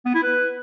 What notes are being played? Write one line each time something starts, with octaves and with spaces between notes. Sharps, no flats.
B3
E4
B4